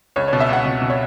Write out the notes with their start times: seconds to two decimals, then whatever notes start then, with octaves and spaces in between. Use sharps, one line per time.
0.16 C#2 C#5
0.28 B2 C#5
0.40 E5
0.49 C#2 F#5
0.66 B2
0.82 B2
0.90 C#5